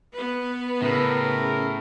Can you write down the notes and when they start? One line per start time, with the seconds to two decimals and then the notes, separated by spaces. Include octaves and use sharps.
0.13 B3 B4
0.82 A2 C#3 A#4